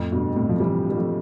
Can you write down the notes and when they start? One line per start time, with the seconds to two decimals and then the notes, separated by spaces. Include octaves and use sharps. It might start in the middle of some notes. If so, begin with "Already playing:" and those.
Already playing: F2 A2
0.12 G2 B2
0.36 A2 C3
0.49 F3
0.60 E3 G3
0.90 G3
0.96 F3 A3